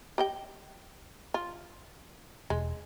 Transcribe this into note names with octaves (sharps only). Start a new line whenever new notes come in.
G4 D#5 G5
F4
E1 G#3